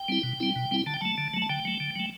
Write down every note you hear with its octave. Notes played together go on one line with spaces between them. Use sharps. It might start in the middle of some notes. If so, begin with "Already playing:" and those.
Already playing: G5
G3 C4 E4
B2
G3 C4 E4
B2
G3 C4 E4
D3 A5
G5
F#3 A3 A5
D3
F#3 A3
A5
D3 G5
F#3 A3
D3
F#3 A3